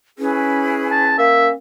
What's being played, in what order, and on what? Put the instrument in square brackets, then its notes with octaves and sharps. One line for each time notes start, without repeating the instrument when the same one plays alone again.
[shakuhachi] C#4 [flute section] E4 G#4 B4
[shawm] A5
[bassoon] A#3 [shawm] E5